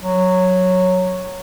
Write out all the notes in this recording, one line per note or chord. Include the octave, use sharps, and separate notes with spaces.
F#3